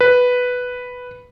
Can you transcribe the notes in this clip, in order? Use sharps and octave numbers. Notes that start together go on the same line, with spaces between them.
B4